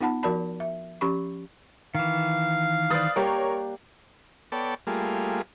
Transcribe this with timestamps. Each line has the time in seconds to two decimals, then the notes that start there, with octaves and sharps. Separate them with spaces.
0.01 B3 D#4 F4 F#5 A5 B5
0.23 F3 F#4 A#4 D5 A5 B5
0.60 E5
1.01 F3 C#4 G4 B5 C#6
1.95 D#3 E3 F5
2.90 B4 C5 D5 D#6 F#6 A6
3.16 G3 A#3 G4 A#4 C#5
4.52 B3 A4 C#5 D5 G5 A5
4.87 G3 A3 A#3 F4 G#4